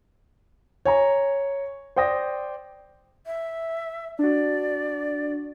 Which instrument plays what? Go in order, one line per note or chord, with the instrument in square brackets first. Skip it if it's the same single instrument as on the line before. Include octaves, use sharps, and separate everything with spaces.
[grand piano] C#5 G#5 A#5
C5 D5 G5 D#6 A#6
[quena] E5
[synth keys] D4 F#4 [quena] D5